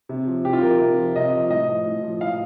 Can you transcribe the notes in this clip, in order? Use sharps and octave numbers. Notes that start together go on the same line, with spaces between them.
C3
F3
C3 G4
F4
F3 A#4
C3
F3
C3 D#5
F3
A2 D#5
F3
A2
F3
A2 F5